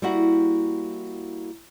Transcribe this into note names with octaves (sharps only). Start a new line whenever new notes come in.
G3 A#3 E4 F#4 F#5